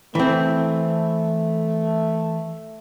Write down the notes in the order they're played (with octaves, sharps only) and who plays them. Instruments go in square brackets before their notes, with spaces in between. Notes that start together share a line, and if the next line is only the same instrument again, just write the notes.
[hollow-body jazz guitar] E3 C4 [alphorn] A3